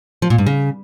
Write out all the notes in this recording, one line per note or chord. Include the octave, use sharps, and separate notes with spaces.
F3
A#2
G2
C#3